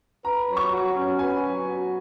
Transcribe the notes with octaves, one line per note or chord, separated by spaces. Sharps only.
B4 A#5
F#3
C#6
F#4
C#4
B4 G#5
F#3
F#4